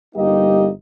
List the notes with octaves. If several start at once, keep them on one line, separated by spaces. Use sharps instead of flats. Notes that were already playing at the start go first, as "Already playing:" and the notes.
G1 G3 A#3 D#4 G4 D#5